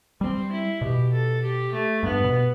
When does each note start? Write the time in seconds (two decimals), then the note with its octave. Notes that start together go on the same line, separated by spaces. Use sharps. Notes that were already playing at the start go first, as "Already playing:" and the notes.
0.21 G3 C4
0.52 E4
0.81 B2 G4
1.12 A4
1.42 G4
1.73 A3
2.03 G2 B3
2.24 B2